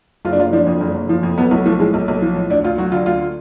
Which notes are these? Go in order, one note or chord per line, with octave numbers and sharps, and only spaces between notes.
F#1 F4
D4
F#1 F4
F3 D4
F2
F#1
F#1
F3
F2
B1 B3
B1 A3
F3 A3
A2 G#3
B1
B1
F3
A2
D2 D4
D2 F4
F#3 F#4
D3 F4
D2 F4